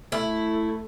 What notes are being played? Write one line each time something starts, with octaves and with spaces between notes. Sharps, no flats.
A3 E4